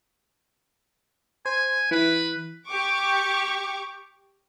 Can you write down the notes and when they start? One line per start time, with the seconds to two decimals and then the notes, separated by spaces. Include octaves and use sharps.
1.46 C5 G#5
1.91 E3 B4
2.67 G4 C#6 D6